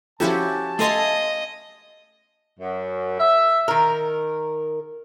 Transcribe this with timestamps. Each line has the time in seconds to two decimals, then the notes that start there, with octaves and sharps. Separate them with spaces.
0.20 F3 C#4 E4 F#4 G4 A4 A5
0.79 A3 A4 D#5 F5 G#5 C6
2.60 F#2
3.19 E5
3.68 D#3 A#4